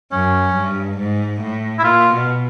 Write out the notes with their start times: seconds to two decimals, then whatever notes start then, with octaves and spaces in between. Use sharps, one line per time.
0.12 F#2 C#4
0.56 G2
0.99 G#2
1.41 A2
1.79 E4
1.84 A#2 F4
2.14 B2